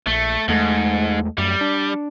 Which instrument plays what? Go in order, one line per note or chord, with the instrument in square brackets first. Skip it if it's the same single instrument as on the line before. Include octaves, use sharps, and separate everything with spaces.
[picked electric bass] A#1 [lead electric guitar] A3
[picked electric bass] E2 G#3 A3 [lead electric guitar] G#2
[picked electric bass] F#2 A3 [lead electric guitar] G3
[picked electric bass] D4